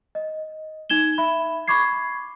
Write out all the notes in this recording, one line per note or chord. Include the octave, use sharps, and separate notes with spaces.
D#5
D#4 G#6 E7 G7
E5 B5
B5 C#6 D6 G#6 C7